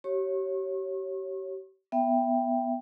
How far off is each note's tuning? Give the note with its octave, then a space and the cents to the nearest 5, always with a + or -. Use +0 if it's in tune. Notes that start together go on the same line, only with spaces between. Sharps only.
G4 -35 C#5 -10 C#6 -35
B3 +0 E5 +20 G5 +0